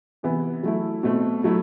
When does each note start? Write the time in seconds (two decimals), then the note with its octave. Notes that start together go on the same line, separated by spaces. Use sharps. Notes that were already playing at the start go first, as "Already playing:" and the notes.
0.23 C3 E3 B3 E4
0.63 F#3 A3 E4
1.03 B2 A3 C4
1.44 F#3 A3 E4